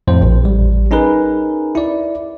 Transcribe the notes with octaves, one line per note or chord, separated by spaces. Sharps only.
F2 A2 C5
A#1
A1 G3
C#4 D#4 G#4 A#4 B4
E4 D5